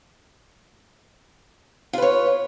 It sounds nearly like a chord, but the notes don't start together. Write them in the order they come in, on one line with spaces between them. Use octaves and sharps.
F4 B4 C#5